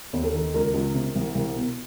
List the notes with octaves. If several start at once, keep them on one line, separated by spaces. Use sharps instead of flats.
D#2
A4
D#3
C#2 A#4
C#2
C3
C2
C2
B2